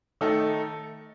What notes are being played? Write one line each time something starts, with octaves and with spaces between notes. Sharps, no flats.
D#3 A3 D#4 A4